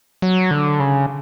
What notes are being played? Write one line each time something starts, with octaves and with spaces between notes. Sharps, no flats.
F#3
D3
C#3